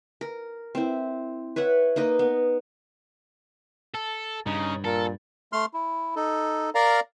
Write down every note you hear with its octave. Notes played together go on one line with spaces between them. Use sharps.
A#4
C4 E4
B4 C#5 E5 F#5
A#3 D#4 B4 D#5
B3
A4
G2 C#3 D#4
A#2 A4 A#4
A3 C6 F6
E4
D#4 A4
A#4 D5 F5 A#5